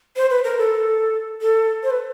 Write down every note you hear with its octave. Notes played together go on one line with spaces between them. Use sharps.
C5
B4
A#4
A4
A4
C5
B4